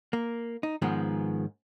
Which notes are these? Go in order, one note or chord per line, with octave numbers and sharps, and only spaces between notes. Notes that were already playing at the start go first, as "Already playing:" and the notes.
A#3
D#4
G#2 D#3 F3 G#3 B3